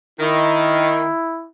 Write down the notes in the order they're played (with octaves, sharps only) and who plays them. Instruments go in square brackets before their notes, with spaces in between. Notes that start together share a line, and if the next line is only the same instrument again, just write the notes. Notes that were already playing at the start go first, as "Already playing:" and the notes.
[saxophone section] D#3 [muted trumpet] E4